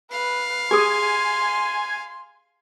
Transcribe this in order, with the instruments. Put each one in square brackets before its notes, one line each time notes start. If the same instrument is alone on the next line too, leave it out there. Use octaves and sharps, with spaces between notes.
[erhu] B4 [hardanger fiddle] F5
[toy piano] G4 G#4 D#6 [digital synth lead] G#5 [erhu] C6